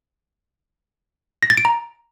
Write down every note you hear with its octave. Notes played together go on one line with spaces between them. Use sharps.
A#6
A6
D7
A#5